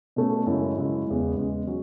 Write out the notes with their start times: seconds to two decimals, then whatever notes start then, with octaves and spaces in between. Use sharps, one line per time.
0.16 B2 A3 C#4
0.46 F#2 C#3 G#3 C#4 E4
0.76 F#2 C#3 G#3 C#4 E4
1.07 E2 C#3 G#3
1.36 E2 C#3 G#3
1.67 F#3 C#4